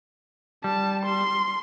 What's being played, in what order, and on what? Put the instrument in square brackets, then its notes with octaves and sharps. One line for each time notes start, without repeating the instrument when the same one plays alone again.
[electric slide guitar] G3 [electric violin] A5
[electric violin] C6